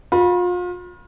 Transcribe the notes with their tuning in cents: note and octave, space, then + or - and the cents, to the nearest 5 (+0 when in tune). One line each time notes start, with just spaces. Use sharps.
F4 +35 B5 -25